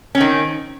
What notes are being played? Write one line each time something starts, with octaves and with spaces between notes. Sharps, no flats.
D#3 C4 C#4